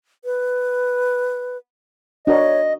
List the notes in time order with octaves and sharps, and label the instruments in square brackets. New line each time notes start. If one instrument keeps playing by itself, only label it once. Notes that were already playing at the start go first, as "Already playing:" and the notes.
[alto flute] B4
[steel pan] D4 F#4 A#4 [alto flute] C#5 [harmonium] D#5